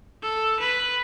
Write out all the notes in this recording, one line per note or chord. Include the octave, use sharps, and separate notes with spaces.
A4
B4